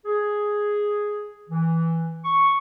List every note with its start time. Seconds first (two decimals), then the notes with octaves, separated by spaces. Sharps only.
0.06 G#4
1.50 E3
2.25 C#6